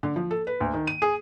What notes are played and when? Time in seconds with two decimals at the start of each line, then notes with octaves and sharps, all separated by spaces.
0.03 D3
0.16 F3
0.31 A4
0.47 B4
0.60 D2
0.74 D#3
0.87 D#7
1.02 G#4